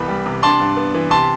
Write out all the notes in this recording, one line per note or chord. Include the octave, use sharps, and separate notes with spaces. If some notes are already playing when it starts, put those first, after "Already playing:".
Already playing: C2 E3 B3 B5
G3
C3
D4 A5 C6
G2
B3
E3
C3 A5 C6